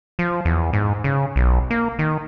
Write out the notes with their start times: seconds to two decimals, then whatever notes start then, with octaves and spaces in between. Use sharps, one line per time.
0.19 F3
0.45 E2
0.73 G#2
1.04 C#3
1.36 B1
1.70 A#3
1.99 D#3